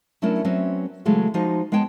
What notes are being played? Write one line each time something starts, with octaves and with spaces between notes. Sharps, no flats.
F#3 A3 C#4 D4 E4 A#4
F#3 C4 C#4 B4 C5 E5
C#3 E3 F#3 G#3 A3
F3 G#3 D#4 F#4
G#3 B3 C#5 G5 A5